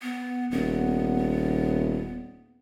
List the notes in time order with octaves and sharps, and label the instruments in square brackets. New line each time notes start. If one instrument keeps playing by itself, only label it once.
[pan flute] B3
[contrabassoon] D#1 [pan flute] B3